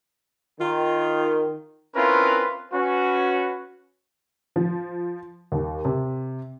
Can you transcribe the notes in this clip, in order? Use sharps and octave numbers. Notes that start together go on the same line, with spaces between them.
D#3 F4
C4 C#4 E4 F4 A#4 B4
C#4 F#4 B4
F3
D#2
C3